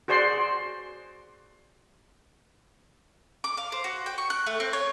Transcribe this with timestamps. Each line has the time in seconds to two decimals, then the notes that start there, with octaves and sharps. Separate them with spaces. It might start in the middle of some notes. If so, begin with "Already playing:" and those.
0.08 F#4 G#4 C5 D5 C6
3.44 D6
3.57 F5
3.72 C5
3.84 F#4
4.06 G5
4.18 C#6
4.30 F#6
4.47 A3
4.60 C4
4.73 C#5